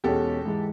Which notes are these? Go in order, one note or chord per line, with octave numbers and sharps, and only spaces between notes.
E2 B2 G#3 C#4 G4 A4
G#2 E3 G#3